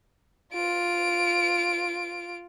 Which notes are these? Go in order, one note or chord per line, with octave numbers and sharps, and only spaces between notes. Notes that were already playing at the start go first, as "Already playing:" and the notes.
F4 D7